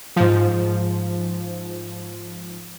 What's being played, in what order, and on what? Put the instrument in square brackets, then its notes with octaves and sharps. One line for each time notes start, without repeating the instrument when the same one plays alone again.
[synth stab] G#2 F3